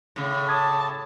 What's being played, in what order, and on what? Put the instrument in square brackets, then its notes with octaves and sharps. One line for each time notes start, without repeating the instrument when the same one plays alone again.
[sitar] A2 C#3
[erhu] A5 [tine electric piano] D6 D#6 G#6